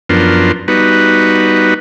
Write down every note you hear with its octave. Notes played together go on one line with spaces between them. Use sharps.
F#2 F3 B3 D4 A#4 C6
G3 B3 D#4 F#4 B4